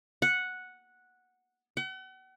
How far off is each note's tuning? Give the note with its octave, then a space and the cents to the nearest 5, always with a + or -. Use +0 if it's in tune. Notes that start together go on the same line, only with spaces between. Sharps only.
F#5 -5
F#5 +40